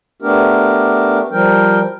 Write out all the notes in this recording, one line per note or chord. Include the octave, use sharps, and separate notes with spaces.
A3 B3 D4 G4 A#4
F3 G3 A#4 G5